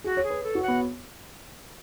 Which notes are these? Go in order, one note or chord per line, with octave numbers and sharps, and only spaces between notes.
F#4 G#4
C#5
G#4
B4
A4
F#4
F#5
B3